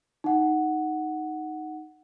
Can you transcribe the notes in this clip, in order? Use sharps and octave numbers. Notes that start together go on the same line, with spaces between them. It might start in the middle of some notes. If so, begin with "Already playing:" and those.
D#4 F#5